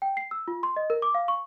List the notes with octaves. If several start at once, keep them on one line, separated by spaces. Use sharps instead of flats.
G5
C7
E6
F4
C6
D#5
A#4
D6
F5
C#6